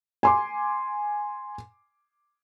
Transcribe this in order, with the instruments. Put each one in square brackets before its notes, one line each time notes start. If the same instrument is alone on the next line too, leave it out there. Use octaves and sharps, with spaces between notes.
[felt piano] G#5 C6 D6